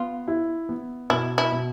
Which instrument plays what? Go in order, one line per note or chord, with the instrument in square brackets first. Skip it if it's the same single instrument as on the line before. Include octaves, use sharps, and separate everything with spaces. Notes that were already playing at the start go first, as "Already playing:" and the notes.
Already playing: [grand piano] B3 [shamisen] F4
[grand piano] E4
B3
[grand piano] B2 [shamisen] E4
[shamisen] E4
[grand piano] B2